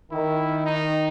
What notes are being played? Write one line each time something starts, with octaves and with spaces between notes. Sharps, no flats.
D#3 E4
D#4